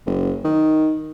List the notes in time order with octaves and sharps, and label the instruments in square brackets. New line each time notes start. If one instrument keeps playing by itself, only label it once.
[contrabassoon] F#1
D#3